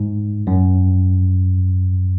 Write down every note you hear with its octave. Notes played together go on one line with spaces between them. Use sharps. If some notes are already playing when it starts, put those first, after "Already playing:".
Already playing: G#2
F#2